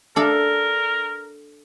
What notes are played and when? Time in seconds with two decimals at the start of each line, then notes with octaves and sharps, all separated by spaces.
0.16 D4 A4 A#4 F5